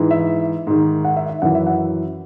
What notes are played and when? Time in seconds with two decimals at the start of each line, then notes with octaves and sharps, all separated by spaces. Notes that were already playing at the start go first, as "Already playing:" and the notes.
Already playing: G#2 E3
0.11 E5
0.67 G#2 D#3
1.05 F#5
1.17 E5
1.29 E5
1.42 F#2 E3 F#5
1.55 E5
1.67 F#5